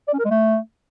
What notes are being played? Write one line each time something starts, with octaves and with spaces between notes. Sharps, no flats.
D5
C#4
A#4
G#3
A3